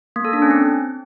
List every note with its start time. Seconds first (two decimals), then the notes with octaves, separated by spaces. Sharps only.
0.16 A#3
0.25 A4
0.33 D4
0.42 C#4
0.51 C4